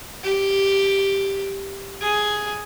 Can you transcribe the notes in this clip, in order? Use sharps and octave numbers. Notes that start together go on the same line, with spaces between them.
G4
G#4